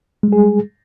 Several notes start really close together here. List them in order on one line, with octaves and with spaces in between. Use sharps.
G#3 G3 G#4